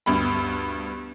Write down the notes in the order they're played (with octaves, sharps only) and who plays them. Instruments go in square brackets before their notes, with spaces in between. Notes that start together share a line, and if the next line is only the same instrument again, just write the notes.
[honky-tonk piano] D2 G2 B3 B5